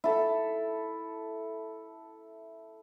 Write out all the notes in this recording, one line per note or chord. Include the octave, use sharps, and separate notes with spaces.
E4 A4